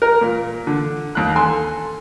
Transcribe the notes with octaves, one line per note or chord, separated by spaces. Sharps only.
A#4
A#2
D3
D#2 F#6
A4 G#5 C6